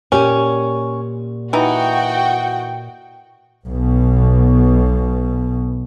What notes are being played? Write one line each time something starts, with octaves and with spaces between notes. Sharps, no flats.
A#2 C#4 G4 G#5
E3 D#4 F#4 G5
B1 B2